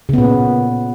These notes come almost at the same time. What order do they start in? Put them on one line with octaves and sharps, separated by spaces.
C#3 B3 A#2